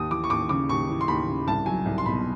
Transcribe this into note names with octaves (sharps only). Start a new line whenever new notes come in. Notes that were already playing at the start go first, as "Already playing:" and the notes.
Already playing: D#2 D#6
E3 D6
C#6
D#2 D6
C#3 D6
D#2 C#6
E3
C6
D#2 B5
C#3
C2 A5
F#3 G#5
C2
C6
B2 B5